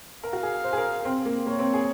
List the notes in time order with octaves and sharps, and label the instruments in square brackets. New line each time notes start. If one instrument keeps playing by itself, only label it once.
[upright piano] A#4 [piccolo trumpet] F5
[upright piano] F#4
G#4
C5
G#4
A#4
C4
A#3
[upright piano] A#3 [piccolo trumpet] C#5
[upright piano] C4
G#4